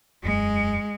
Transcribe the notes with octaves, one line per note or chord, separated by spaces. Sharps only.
E1 F#2 G#3